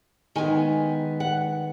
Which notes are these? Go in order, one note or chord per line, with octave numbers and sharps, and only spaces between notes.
D#3 G#3 B3 G#5
F#5